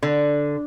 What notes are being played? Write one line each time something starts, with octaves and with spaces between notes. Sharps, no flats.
D3